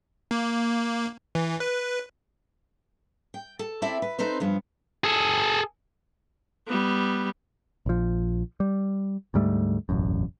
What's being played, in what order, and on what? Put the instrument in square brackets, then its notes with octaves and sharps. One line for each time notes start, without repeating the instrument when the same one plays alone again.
[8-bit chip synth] A#3
E3
B4
[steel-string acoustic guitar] G5
A4
C4 E4 A4 D5 E5
B4
C4 D#4 A4 B4 C5
G2 F3 B3
[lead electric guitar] G#4 A4
[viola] G3 B3
[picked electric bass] A#1 F3
G3
D2 G#2 G3 A3
E1 A1 F#2